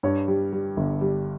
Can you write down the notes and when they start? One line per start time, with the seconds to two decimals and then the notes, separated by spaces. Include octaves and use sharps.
0.03 G2 C#5
0.28 G3
0.53 G3
0.77 G1
1.01 G3